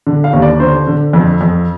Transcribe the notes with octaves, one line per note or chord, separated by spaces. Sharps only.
D3
F5
D#2
D5
D3 C5
D3
F2
F2